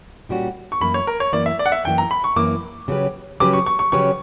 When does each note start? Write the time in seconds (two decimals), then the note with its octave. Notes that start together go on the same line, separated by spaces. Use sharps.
0.29 A#2 G3 C#4 F#4
0.72 C#6
0.81 F#2 E3 A#3 B5
0.94 C#5
1.07 A#4
1.20 C#5
1.33 F#2 E3 A#3 D5
1.46 E5
1.59 D5
1.66 F#5
1.72 E5
1.85 F#2 E3 A#3 G5
1.98 A#5
2.11 B5
2.24 C#6
2.36 F#2 E3 A#3 D6
2.88 C#3 F#3 C#4 G4 B4
3.40 C#3 F#3 C#4 G4 B4 D6
3.53 C#6
3.66 C#6
3.79 C#6
3.92 C#3 F#3 C#4 G4 B4 C#6